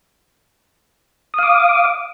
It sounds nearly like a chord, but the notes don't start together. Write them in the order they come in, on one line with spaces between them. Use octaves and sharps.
D#6 F5 D6